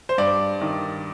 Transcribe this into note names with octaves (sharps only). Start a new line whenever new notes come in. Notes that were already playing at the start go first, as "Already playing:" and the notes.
C5
G2 D5
D#3